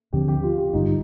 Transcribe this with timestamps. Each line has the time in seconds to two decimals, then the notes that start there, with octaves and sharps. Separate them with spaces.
0.13 D#2 D3 F3 C4 G4
0.28 G4
0.43 F4
0.58 G4
0.73 G#1 G2 D3 D#4